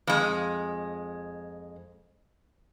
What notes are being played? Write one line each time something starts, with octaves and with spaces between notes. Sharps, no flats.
F2 G#3